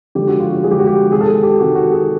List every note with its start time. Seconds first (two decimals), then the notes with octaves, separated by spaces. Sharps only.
0.15 D3 F3 G#3 G4
0.27 F#4
0.39 F4
0.51 F#4
0.64 D3 F3 G#3 G#4
0.71 G4
0.79 F#4
0.87 G4
1.11 C3 D#3 G#3 G#4
1.21 A4
1.28 G#4
1.43 G4
1.59 C3 D#3 G#3 F#4
1.75 F#4
1.92 G#4